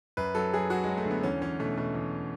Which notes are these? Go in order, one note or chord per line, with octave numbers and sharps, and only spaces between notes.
F#2 B4
F#3 A4
F#3 G#4
F#3 F#4
F#3 G#3
A3
D3 B3
E2 C#4
E2 C#4
B2 A3
B2 A3
E2